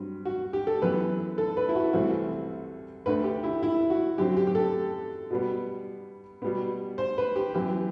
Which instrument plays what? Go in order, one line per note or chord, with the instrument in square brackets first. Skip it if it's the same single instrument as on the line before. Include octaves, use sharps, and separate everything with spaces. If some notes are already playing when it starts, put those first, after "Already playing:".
Already playing: [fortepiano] G2 F#3 C4
F#4
G4
A4
F#2 E3 B3 B4
A4
B4
E4
F#4
C2 C3 E3 A3 C4 F#4
D2 D3 A3 B4
G4
E4
E4
F#4
F#2 D3 F#3 C4 G4
G4
G4
A4
B2 G3 B3
B2 G3 B3
C5
B4
G4
F#2 E3 B3 G4